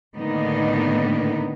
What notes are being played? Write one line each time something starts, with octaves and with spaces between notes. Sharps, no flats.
A2 D3 D#3 A#3 B3 D#4